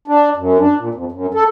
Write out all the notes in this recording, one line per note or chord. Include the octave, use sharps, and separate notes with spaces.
D4
F#2
D4
A#2
F2
F#2
A4